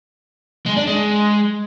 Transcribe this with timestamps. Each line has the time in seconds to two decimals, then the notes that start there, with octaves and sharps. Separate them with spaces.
0.66 G#3
0.77 D4
0.87 G#3